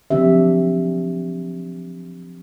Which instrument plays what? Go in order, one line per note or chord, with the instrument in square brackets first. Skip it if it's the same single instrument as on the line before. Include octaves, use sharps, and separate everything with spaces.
[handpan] F3 F#3 C4 D4 G4 E5